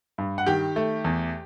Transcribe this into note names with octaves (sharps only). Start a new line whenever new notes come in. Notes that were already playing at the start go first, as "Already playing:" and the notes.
G2
F#5
D#3 G4 G5
A3
E2